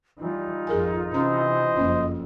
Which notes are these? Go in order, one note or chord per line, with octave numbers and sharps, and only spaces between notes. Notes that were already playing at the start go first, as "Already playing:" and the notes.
E3 G3 D#4 F4
G#1 F2 G#4 A#4 G#5
C3 E3 C#4 C5 D#5 A#5
F#1 F2 A#3 C#4